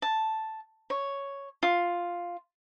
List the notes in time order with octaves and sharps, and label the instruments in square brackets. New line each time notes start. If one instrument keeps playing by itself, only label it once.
[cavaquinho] A5
C#5
F4